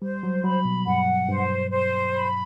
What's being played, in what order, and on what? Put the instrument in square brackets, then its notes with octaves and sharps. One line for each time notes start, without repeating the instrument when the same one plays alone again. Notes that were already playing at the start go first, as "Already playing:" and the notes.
[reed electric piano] G3 [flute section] C5
[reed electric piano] F#3
[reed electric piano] F#3 [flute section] B5
[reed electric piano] B2
[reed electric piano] G2 [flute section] F#5
[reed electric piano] G2 [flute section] C5
[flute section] C5
B5